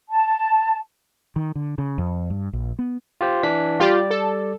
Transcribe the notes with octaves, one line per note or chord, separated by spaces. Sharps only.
A5
D#3
D3
C#3
F2
G2
A#1
B3
F4 G4 C5
E3 D4 B6
G3 F4 G4 D5
A4